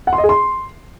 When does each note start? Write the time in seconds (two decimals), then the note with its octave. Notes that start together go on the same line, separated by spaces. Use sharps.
0.07 F#5
0.13 C6
0.18 D#5
0.24 G#4
0.29 C6